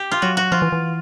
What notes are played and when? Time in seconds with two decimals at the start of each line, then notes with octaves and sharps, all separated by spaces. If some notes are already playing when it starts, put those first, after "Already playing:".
Already playing: G4
0.11 F4
0.22 F#3 F#4
0.37 F#4
0.52 F3 F4
0.62 E3
0.72 E3